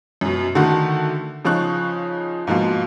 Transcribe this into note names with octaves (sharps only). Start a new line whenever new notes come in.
F#2 B2
D3 D#3 A3 F#4 F#5
C#3 F3 D#4 C#6 F#6
G#2 B2 F3 A#3